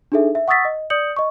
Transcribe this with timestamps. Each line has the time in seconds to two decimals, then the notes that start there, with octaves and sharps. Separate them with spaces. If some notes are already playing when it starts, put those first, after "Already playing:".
0.12 D4 D#4 G#4 A4 E5
0.35 E5
0.48 F#5 C#6 D#6 E6 A6 B6
0.65 D#5
0.90 D5 D#6 G6 C#7 F#7
1.16 D#5 C#6